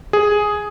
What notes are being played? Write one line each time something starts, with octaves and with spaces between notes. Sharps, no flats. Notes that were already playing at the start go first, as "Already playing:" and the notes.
G#4